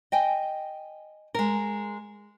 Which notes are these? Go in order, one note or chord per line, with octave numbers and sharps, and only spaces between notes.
D#5 G5 G#5
G#3 A#4